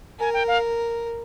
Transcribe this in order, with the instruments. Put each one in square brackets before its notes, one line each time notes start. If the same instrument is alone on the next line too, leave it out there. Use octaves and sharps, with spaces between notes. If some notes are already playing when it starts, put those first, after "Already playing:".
[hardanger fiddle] A#4 [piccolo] G#5
[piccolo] G5
F5